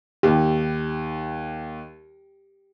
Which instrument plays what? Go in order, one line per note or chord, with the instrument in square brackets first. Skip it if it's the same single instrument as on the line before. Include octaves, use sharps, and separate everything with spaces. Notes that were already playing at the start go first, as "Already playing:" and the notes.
[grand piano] D#2 [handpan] G4